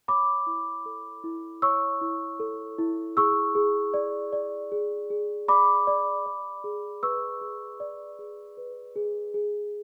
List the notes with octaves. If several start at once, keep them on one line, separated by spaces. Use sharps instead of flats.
C#5 B5 D6
E4
A4
E4
C#5 C#6 E6
E4
A4
E4
G#4 C#6 E6
G#4
D5
D5
G#4
G#4
D5 B5 D6
D5
D5
G#4
B4 C#6 E6
G#4
D5
G#4
B4
G#4
G#4